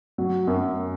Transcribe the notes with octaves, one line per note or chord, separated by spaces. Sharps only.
F#3
F#2